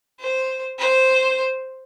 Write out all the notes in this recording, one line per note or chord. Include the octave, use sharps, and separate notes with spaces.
C5
C5